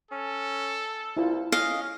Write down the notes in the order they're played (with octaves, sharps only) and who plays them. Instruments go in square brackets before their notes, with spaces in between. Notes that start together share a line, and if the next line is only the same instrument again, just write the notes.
[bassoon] C#4 [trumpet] A4
[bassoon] C2 [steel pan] E4 F4
[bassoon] C#4 [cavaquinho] D#5 F5